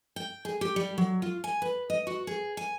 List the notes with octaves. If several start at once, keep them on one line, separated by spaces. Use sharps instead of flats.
G5
G#4
G4
G3
F#3
F4
G#5
B4
D#5
F#4
G#4
G#5